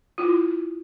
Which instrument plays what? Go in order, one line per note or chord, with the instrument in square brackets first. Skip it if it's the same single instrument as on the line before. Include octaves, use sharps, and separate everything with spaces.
[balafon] E4 F4